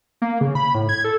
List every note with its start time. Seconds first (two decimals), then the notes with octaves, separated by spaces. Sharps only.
0.22 A#3
0.41 C#3
0.55 B5
0.75 A2
0.89 G#6
1.04 A4